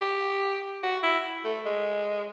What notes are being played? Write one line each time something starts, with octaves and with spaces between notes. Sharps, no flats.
G4
F#4
E4
A3
G#3